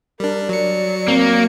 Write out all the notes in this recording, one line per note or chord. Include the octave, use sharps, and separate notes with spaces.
G3 D4 A#4
F#3 D5 C#7
A#3 C4